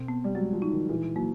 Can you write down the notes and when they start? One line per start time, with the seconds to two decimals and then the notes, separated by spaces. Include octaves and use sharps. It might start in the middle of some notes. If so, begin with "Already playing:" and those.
Already playing: B2 C4
0.08 B3
0.24 G3
0.35 F#3 G#3
0.53 F3
0.62 D#4
0.72 D#3
0.89 A#2 E3
1.16 F#3 A#3